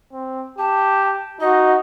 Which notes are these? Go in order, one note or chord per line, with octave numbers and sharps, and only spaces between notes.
C4
G4 A5
D#4 F#4 D#5